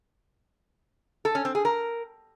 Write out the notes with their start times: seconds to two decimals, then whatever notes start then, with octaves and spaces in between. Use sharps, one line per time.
1.25 A4
1.35 C#4
1.45 C4
1.55 G#4
1.65 A#4